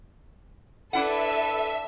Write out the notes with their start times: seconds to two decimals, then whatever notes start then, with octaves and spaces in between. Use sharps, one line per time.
0.93 D4 E4 A4 B4 E5 F#5